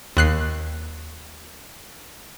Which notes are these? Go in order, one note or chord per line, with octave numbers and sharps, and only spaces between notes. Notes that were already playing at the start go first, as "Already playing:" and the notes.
D#2 F#6 C7